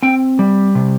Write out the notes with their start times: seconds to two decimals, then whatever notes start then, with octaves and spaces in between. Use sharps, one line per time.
0.02 C4 G5
0.39 G3
0.75 C3